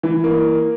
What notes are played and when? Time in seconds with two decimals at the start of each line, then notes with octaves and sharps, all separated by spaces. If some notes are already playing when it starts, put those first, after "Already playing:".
0.03 E3
0.24 A#3